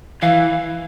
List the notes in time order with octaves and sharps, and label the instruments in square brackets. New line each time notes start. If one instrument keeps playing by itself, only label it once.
[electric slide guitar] E3 [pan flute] F5